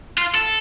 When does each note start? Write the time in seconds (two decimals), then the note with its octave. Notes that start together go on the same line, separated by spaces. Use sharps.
0.18 F4
0.35 A4